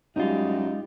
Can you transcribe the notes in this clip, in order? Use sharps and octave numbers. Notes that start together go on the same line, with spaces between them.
F#2 G3 G#3 D#4 F4